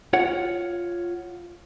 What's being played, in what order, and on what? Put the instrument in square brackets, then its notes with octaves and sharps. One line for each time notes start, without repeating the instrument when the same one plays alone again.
[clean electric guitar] F4 C#5 F#5